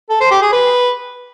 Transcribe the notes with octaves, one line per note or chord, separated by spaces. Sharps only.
A4
C5
G4
G#4
B4